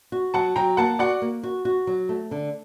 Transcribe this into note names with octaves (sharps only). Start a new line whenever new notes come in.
F#4
F#3 F#5 A5
F#3 G5 A#5
A#3 F#5 A5
F#4 D5 F#5
A#3
F#4
F#4
F#3
A3
D3